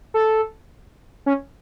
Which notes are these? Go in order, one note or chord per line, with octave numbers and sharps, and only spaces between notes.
A4
C#4